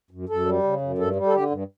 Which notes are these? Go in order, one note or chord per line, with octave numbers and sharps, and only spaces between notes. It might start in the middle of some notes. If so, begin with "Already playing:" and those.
F#2
F#2 A4
G3
C#3
F#2
G2 A4
G3
A4
D3 G4
G2